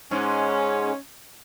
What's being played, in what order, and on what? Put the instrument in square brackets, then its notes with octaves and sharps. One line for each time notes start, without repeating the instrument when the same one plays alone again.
[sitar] G#2 G#3 [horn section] C#4